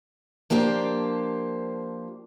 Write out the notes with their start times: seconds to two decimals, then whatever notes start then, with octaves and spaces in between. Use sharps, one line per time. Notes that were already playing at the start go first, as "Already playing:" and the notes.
0.50 F3 A#3 D4 G4 C5